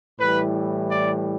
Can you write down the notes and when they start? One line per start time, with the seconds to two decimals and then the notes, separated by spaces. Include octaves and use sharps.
0.20 A2 E3 G3 B4
0.90 D5